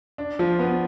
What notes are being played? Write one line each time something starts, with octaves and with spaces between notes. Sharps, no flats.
D4
F3
B3